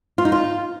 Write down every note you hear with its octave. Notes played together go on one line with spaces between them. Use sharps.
F4
D#4
F4